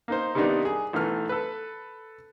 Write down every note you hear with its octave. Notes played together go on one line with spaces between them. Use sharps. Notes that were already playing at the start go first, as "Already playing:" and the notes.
A#3 D#4 C5
C3 D#3 G3 B3 D4 D#4
G#4
B1 E3 A3 F6
A4 B4